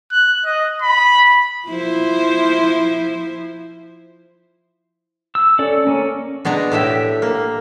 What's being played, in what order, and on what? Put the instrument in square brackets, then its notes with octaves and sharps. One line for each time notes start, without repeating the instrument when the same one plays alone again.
[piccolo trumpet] F#6
D#5
B5
[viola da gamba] F3 E4 C5
[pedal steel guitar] E6
C#4 A4 D5
A#3 C#4
[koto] B2 G#3 D4 A#5
A2 G4 E5
A#3